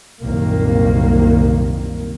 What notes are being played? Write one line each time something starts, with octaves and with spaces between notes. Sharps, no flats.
C2 F#2 A#2 D#3 A#3